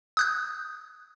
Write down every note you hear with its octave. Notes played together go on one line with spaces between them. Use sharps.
D#6 F#6 G6